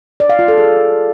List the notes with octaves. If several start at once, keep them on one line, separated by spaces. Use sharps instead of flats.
D5
F5
F4
A4
G#4